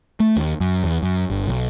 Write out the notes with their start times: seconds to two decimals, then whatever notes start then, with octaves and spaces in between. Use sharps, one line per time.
0.20 A3
0.36 D#2
0.60 F#2
0.84 E2
1.03 F#2
1.30 G1
1.47 B1